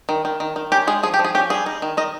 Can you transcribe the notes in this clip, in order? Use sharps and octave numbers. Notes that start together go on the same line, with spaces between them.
D#3
D#3
D#3
D#3
C#4 G4
G#3 G#4
F3 G#4
G4
F3
G#4
C#4 G4
G3 G#4
D#4
D#3
D#3 D#5